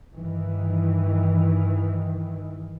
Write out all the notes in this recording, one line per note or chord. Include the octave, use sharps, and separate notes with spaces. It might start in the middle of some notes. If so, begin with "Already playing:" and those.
G2 D#3 E3